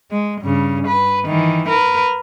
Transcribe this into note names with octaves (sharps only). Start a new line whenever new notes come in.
G#3
G2 C#3
B4
D#3 E3
A#4 B4